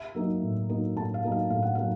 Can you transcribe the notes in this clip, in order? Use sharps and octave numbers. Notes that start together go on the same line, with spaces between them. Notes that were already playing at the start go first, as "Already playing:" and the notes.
Already playing: E5
F#3 A#3 D#4
A2
F#3 A#3 D#4
A2 A5
F5
F#3 A#3 D#4
F5
A2 F5
F#5
F#3 A#3 D#4 F5